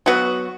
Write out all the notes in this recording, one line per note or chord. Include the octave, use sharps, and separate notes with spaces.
F#3 B3 F#4